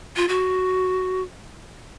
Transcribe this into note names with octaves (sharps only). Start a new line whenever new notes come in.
F4
F#4